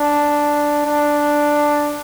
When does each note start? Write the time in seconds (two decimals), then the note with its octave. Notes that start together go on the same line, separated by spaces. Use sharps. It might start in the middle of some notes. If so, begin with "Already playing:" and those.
Already playing: D4
0.86 D4